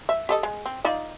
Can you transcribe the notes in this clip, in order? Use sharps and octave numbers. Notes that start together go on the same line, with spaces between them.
E5
G4 A4 D#5
G#3
C4
D#4 F4 D5